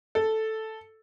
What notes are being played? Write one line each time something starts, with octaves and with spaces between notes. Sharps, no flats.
A4